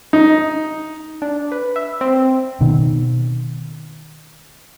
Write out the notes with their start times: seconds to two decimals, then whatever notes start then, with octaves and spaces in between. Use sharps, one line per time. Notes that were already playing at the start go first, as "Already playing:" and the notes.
0.13 D#4
1.22 D4
1.52 B4
1.76 E5
2.01 C4
2.61 B2 D#3